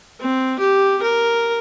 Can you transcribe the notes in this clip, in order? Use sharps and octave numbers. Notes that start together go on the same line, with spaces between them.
C4
G4
A#4